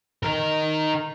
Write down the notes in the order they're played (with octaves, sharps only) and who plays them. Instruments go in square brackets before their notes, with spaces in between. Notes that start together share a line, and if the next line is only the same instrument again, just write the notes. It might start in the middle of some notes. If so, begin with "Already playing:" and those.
[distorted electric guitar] D#4 A#4